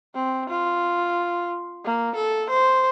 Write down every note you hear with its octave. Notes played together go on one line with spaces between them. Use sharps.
C4
F4
A#3
A4
C5